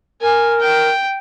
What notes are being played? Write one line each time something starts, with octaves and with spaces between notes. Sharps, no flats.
A#4 G#5
G5